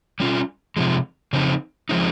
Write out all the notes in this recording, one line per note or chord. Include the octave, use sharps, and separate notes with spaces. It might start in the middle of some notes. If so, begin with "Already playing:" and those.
G3 C#4 F4
C3 F3 G#3
C#3 F3 C4 D#4
F3 G#3 C4 D#4